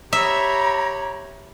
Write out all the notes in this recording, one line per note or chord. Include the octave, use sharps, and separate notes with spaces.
G4 C#5 E5 A#5 B5